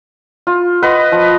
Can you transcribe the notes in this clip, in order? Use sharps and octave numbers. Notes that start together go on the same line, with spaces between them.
F4
B4 D#5 F#5
F3